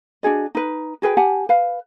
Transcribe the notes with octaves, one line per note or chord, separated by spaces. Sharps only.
D4 F#4 G#4 D#5
D#4 B4
F#4 G#4 B4 G5
G4 F#5 G#5 A5
B4 F5